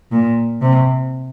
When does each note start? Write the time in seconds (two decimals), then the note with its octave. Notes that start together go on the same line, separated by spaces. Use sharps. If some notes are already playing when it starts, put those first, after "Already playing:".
0.12 A#2
0.61 C3